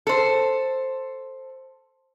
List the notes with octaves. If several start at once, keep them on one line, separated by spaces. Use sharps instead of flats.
A4 C5